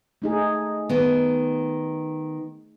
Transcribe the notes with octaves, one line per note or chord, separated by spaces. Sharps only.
A3 D#4 G#4
D#3 B3